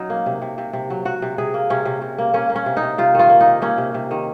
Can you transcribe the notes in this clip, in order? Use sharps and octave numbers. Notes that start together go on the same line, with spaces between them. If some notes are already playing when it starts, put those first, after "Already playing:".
Already playing: F#3 C#4 D#4
A#3
C3
C3
C3
C3
F#3
F#3 F#4
C3
C3 G#4
A#3
C3 C#4
C3
C3
A#3
A#3 C#4
A#3
C#4
C3
D#4
C3
C3 F4
D#3 F4
A#3
D#4
C3
A#3 C#4
C3
C3
D#3